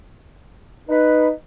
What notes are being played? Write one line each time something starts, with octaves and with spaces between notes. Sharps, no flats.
D#4 B4